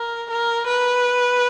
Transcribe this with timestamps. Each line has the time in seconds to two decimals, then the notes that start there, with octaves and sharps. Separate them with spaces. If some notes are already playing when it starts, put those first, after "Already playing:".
Already playing: A#4
0.30 A#4
0.66 B4